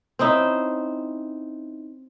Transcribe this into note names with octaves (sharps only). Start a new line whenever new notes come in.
C4 C#4 D#4 E4